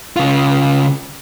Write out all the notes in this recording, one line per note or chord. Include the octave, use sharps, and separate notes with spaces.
C#3 F4